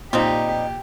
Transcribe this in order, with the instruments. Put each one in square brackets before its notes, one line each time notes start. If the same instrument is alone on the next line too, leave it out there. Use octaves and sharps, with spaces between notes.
[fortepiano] A#2 [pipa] G3 C4 D#4 [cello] G4